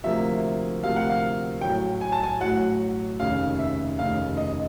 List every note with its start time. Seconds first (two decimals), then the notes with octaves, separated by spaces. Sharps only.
0.04 D2 C3 F3 A#3 E5
0.83 D2 C3 F3 A#3 F5
0.96 F#5
1.09 F5
1.61 A1 A2 F#3 G5
2.01 G#5
2.12 A5
2.23 G#5
2.40 A1 A2 F#3 F#5
3.20 F1 D#2 C#3 F5
3.59 E5
3.98 F1 D#2 C#3 F5
4.37 D#5